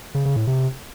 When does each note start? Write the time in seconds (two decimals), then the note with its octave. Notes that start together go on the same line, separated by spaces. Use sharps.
0.15 C#3
0.25 C#3
0.36 A2
0.47 C3